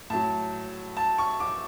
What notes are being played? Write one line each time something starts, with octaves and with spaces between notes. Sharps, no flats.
A2 F#3 A5
A5
C#6
D6